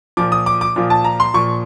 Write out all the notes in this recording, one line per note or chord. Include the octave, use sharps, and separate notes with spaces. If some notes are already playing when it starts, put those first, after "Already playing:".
A#2 F3 D6
D#6
D6
D6
A#2 F3
A5
A#5
C6
A#2 F3 C#6